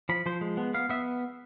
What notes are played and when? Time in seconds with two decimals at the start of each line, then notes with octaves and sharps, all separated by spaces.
0.09 F3 B5
0.26 F3 C5
0.41 G#3
0.57 B3
0.74 B3 F5
0.89 B3 E5